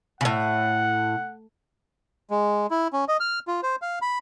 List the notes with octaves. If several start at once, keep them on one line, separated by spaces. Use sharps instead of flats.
A2 C#3 F#5
G#3
E4
C#4
D#5
F6
F4
C5
F5
B5